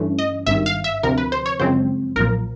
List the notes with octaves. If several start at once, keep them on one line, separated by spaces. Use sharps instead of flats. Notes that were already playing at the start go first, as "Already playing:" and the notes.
Already playing: G2 E3 A3 C#4
D#5
G#1 G2 D#3 E5
F5
E5
D2 C3 F3 A#4
B4
C5
C#5
F#2 C#3 F3 G#3 C4 C5
B1 A#2 F3 A#4